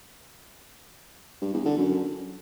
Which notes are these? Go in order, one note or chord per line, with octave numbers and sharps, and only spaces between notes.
G2
E2
D3
F#2